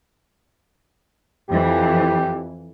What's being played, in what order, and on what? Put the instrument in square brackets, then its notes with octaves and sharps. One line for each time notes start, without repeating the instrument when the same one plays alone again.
[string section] F2 E3 [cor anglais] G4